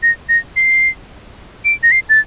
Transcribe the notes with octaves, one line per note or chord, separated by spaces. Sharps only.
A#6
A#6
C7
D7
A#6
C7
A6